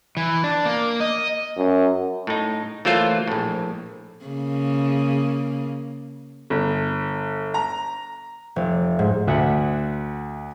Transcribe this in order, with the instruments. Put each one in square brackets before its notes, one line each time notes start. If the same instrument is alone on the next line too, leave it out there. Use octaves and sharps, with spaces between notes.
[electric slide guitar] E3
D4
A#3
D#5
[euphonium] F#2
[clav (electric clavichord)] A2 D#4
E3 F#3 A3 A#3 F4 C5
A#1 A2
[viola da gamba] C#3 A#3
[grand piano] G1
A#5
[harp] F1
G#2
[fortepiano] D2 E5 F#5